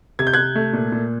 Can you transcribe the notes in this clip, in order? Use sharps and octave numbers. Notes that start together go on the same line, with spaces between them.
C3 G#6
G6
C3 F#6 G#6
A3
A#2
A#2